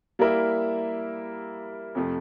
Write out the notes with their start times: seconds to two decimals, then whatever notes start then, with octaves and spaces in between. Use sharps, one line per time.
0.19 G3 A#3 E4 A#4 E5
1.95 F2 C3 F3 A3